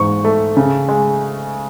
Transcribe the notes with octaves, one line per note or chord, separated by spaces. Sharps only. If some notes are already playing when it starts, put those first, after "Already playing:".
Already playing: G#2 E3 C#6
A3
C#3
G#3